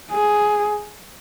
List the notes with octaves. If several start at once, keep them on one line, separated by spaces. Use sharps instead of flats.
G#4